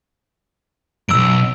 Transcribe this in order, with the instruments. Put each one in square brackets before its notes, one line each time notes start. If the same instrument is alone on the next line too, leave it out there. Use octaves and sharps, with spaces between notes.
[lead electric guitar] B1 F#2 [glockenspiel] E6 D7